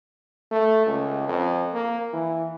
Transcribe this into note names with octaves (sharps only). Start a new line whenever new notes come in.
A3
C#2
F2
A#3
E3